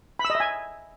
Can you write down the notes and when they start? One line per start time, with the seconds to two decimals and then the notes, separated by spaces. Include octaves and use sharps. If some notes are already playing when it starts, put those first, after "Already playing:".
0.19 B5
0.25 E6
0.30 D#5
0.35 E5
0.40 G#5